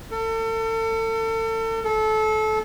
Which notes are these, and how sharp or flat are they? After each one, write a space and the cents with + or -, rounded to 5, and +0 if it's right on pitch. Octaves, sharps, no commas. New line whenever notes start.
A4 +35
A4 -25